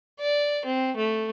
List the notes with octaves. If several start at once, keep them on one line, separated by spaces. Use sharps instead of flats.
D5
C4
A3